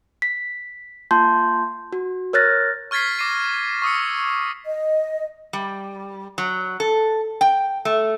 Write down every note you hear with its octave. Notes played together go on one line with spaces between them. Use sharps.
B6
A#3 F4 A5 C6 G6
F#4
A#4 C#5 F6 F#6 A6 A#6
C#6 F6 G#6 A6 B6 C7
D6 A#6 C7 D#7
C#6 D#6 E6 C#7
D#5
G3
F#3
A4
G5
A3